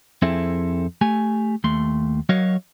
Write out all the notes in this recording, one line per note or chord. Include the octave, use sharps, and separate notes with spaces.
F2 C4 E4 G#4 A4 E5
A3 G4 G#5
D#2 A3 C6
F#3 F#4 A#4 C#5 D#5 F5